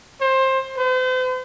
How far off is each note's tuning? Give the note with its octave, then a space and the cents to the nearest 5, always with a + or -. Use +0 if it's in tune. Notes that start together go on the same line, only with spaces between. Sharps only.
C5 +20
C5 -45